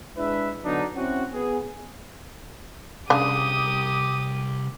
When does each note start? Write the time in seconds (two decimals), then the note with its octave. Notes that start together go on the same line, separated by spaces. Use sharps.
0.17 G#3 D4 E4 B4 E5
0.64 D3 F#3 B3 D4 D#4
0.95 C4 C#4 E4 F#4
1.32 B3 G#4
3.10 C2 C#3 D4 G4 D6 D#6